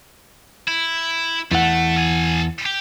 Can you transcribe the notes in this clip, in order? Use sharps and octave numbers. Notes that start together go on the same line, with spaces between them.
E4
E2 E3 A3 F#5
A4 G#5
G4